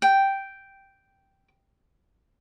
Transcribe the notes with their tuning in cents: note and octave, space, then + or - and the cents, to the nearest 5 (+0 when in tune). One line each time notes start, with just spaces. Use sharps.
G5 -5